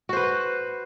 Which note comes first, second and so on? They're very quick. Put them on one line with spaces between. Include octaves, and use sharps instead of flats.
F#4 C5 B4